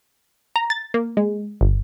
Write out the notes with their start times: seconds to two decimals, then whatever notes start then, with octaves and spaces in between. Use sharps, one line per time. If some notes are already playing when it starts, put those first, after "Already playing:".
0.56 A#5
0.70 A6
0.94 A#3
1.17 G#3
1.61 G1